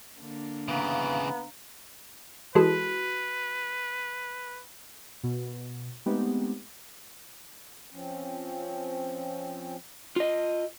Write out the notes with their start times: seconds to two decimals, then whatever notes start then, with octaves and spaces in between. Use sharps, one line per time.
0.20 D3 A#3
0.68 C#3 E3 B3 F5 A#5
2.55 E3 G#3 F#4 A4 B4
5.23 B2
6.06 G#3 A3 B3 C4 D#4 G4
7.90 F3 C4 C#4
10.16 F4 D#5